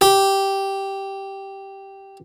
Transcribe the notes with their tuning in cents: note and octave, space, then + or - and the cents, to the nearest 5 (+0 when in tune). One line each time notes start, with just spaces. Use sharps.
G4 -5